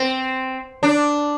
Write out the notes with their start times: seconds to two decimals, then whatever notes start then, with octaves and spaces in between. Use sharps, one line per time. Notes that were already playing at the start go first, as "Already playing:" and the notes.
Already playing: C4
0.83 D4